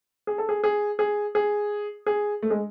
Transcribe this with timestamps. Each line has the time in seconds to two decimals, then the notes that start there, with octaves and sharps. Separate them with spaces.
0.27 G#4
0.38 A4
0.49 G#4
0.64 G#4
0.99 G#4
1.35 G#4
2.06 G#4
2.42 A3
2.50 G#3